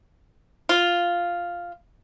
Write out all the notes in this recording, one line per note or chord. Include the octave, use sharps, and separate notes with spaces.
F4